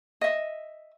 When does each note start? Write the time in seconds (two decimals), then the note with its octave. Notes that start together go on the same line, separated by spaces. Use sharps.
0.21 D#5 E5